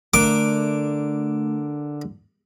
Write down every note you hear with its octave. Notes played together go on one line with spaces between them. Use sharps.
D3 A3 A#4 D6